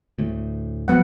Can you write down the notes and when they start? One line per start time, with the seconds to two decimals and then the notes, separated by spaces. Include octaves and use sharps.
0.18 D2 A2
0.88 G1 F3 F#3 B3 F#5